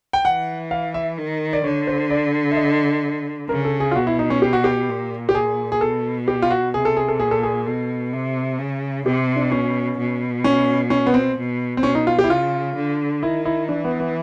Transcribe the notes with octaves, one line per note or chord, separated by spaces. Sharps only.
G5
E3 F#5
F5
E5
D#3
D5
D3 C#5
C5
D5
E5
D#5
C#3 A#4
A4
G#4
F4
B2 F#4
E4
D#4
C#4
G4
F#4
G4
A#2
G4
G#4
G#4
B2 A4
G4
F4
F#4
C3 G#4
A4
G#4
A4
A#2 G#4
A4
G#4
B2 A4
C3
C#3
C3 G4
D4
B2 C#4
B2
C#4
C#4
B3
C4
B2
C4
B2 C#4
D#4
F4
G4
E4
C#3 F4
D3
D#3 E4
E4
E3 D4
B3
B3